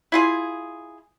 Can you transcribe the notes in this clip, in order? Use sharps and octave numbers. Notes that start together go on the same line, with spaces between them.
E4 F4 G#4